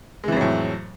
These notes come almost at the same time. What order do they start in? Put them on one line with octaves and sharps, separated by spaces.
G#3 E3 F2 F#3 A2